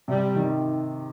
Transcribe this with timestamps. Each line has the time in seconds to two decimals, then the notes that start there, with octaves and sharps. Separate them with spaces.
0.08 C3 G3
0.36 D#3